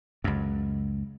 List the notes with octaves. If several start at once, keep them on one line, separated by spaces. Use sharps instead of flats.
C#2 F#2